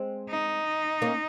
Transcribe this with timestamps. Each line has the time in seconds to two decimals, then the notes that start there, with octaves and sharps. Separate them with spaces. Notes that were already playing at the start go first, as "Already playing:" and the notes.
Already playing: G#3 C4
0.30 D#4
1.02 A#3 C#4